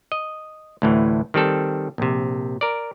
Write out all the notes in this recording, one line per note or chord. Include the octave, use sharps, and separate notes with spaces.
D#5
D2 A2 E3
D#3 G3 C4 A4
A#1 C3
A#4 D5